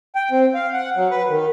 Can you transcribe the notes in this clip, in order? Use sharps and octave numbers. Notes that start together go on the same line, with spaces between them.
G5
C4
F5
F#5
F#3
B4
D#3